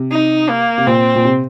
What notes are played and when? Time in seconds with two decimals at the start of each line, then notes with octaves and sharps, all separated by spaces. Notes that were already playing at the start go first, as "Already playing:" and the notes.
Already playing: C3
0.12 D#4
0.49 A#3
0.78 C3
0.87 A#2 C4
1.15 A#2
1.25 C3